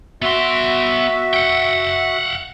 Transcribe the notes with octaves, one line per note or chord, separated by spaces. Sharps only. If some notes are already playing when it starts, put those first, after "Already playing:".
B3 F#4 E5 C6
F#5 G5